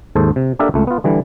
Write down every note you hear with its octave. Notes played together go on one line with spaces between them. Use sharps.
D#2 G#2 A4 C5
C3
A#3 D4 G4 A4 A#4 E5
C#2 A3
B3 F4
D3 E3 G3